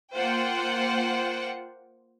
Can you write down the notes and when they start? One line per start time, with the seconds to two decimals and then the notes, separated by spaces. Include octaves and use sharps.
0.15 A#3 F4 C5 F#5 G5